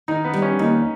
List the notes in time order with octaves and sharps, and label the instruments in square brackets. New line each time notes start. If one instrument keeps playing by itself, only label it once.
[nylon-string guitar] D#3 [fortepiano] D#4
[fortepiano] B3
[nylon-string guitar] G3
[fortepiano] C#4
[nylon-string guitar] D#2 [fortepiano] D#4